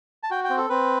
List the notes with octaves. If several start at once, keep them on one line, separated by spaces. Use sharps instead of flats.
A5
F#4 G5
G5
C4
A4
C4 B4